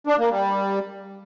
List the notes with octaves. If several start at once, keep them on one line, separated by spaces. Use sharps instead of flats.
D4
A#3
G3